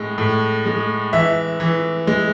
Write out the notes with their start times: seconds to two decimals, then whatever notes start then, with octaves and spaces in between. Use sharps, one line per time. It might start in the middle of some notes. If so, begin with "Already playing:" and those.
Already playing: A2 G#3
0.18 A2
0.66 G#3
1.13 E3 E5
1.60 E3
2.07 G#3